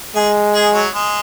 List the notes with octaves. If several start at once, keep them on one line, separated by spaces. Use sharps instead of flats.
G#3 G#4
G#4
F#3
G#3